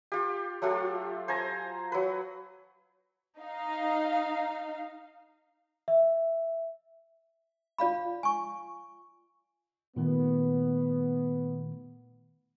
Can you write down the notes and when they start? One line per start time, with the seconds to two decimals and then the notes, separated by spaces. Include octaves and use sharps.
0.12 F4 G4
0.62 F#3 A3 F4 G4
1.28 C5 G#5 A#5
1.92 F#3 B4
3.38 D#4 F5
5.88 E5
7.78 F4 D5 F5 B5
8.23 G#5 C#6
9.96 A#2 D#3 A3 B3